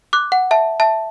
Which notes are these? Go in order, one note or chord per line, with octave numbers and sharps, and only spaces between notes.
D6 F#6
F#5
E5 A5
E5 A5